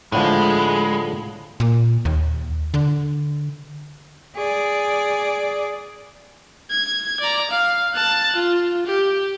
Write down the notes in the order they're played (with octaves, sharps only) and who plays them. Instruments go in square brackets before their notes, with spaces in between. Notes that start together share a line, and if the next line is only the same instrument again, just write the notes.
[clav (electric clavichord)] A2 D3 F3 [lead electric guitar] G#3 [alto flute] B5
[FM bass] A#2
D#2
D3
[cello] G#4 D5
[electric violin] G#6
D5 A#5
F5
A5 F#6
F4
G4